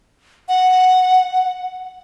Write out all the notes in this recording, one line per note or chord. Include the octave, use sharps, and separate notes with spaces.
F#5